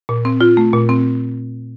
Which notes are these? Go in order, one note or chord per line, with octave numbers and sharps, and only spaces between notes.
A#2
C4
F4
A3
A#2
C4